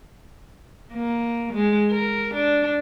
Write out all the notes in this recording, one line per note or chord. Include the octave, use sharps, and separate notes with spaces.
A#3
G#3
A#4
D4